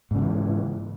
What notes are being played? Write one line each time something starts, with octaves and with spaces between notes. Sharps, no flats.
G#2 C#3 E3 F3